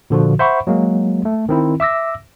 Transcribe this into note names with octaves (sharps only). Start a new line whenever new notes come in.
A#2 D3 F3 F#4
C5 E5 F#5 B5 C#6
F#3 G#3 A#3
A3
D#3 C4 E4
E5 D6 E6 A#6